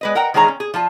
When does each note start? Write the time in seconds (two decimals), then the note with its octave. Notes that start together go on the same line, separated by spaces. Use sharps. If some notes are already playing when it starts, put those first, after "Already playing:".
0.01 G#3 B4 D#5
0.15 A#4 F#5 G5 A#5
0.34 D#3 E3 G#3 G#4 C#5 A#5
0.48 C#4
0.60 G#4
0.74 F3 F4 A5